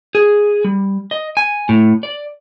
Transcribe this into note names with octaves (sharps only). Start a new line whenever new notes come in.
G#4
G3
D#5
G#5
A2
D5